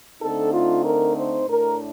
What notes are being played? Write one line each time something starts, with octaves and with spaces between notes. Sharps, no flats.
D3 A3 C4 D#4 A4
F4
A#4
C5
A2 A3 D4 A#4